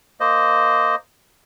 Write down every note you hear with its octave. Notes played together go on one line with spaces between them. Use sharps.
A#3 C5 D#5